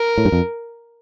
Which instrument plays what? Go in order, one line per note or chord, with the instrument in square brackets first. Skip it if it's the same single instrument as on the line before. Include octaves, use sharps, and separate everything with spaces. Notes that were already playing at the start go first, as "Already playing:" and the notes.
Already playing: [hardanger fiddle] A#4
[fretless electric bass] A2
G2
F2